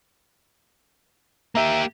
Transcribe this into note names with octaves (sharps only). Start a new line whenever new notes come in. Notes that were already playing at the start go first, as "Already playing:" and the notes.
A#3 G4 E5 A#5